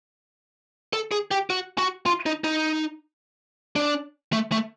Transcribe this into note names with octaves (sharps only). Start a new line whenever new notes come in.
A4
G#4
G4
F#4
F#4
F4
D#4
D#4
D4
A3
A3